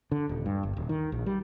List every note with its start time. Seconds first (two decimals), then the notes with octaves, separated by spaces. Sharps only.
0.12 D3
0.29 D#1
0.46 G2
0.63 G1
0.77 D#1
0.89 D#3
1.12 A#1
1.26 G3